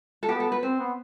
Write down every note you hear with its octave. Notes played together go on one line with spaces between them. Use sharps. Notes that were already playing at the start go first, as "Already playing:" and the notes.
A4
B3 G4
A4
B4
C4 C5
B3